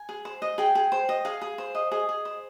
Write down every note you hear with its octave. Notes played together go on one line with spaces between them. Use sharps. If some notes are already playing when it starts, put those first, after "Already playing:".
Already playing: G#5
G#4
C5
D#5
G#4 G5
G#4
C5
D#5
G#4 F5
G#4
C5
D#5
G#4 D#5
G#4
C5